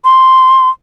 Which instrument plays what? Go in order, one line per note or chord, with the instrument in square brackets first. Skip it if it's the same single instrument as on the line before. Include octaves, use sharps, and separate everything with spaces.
[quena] C6